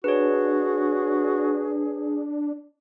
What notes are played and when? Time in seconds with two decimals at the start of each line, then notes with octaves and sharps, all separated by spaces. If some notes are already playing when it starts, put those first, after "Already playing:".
0.04 D4 F#4 G#4 B4 C#5